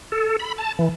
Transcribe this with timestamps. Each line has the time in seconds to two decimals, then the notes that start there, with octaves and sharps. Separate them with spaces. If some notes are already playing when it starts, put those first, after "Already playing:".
0.12 A4
0.39 B5
0.58 A5
0.79 E3